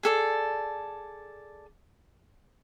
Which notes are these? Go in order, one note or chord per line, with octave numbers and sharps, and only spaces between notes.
G#4 A4 D5